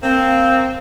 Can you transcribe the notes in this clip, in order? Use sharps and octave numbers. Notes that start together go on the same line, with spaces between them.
A#3 C4